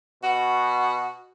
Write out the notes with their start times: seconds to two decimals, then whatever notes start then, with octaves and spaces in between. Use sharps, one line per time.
0.23 B2 F#4